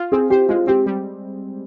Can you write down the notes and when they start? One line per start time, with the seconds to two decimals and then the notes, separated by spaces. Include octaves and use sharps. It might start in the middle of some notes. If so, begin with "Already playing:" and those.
Already playing: F4
0.12 C4 G#4
0.30 G4 C5
0.49 G#3 F4
0.67 C4 G4
0.86 G3